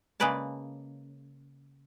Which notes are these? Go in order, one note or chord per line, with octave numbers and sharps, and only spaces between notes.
C#3 G#3 A#3 B4 D5 A5